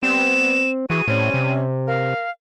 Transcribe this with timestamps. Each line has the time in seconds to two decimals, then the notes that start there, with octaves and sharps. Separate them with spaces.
0.03 G3 B3 C4 E7
0.90 E3 F#4 G#4 D#7
1.08 A2 G3 C4 C#4
1.34 C3
1.88 A#4 F5